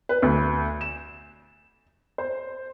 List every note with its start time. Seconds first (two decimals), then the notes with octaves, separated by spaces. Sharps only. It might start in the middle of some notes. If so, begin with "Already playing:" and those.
0.09 B4
0.22 D2
0.81 E7
2.18 C5